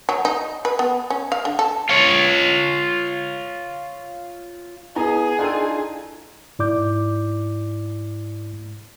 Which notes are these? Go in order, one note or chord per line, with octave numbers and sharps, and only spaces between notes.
F#3
D#4
B4
B3
C#4
F5
D3
A4
F4 C#5
B3 E4 G#4 D#5 G#5 A#5
D4 D#4 F4 A4 G5 G#5
G#2 E4 D5 D6 G6